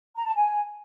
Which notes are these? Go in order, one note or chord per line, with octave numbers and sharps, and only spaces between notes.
A#5
A5
G#5